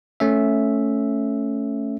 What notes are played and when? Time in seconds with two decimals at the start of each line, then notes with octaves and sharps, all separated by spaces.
0.20 A3 C#4 E5